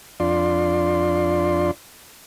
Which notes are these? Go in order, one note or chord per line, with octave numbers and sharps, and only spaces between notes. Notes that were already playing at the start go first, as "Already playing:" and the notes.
F2 D4 F4 D5 C6